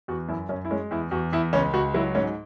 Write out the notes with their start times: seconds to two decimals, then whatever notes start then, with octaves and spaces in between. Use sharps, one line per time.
0.08 E2 F#4
0.28 F#2 E4
0.49 F#2 C#4
0.65 E4
0.71 G#3 C#4
0.91 E2 E4
1.11 E2 F#4
1.32 E2 E4
1.53 C#2 C#4
1.73 C#2 F#4
1.94 F#3 E4
2.15 G#2 C#4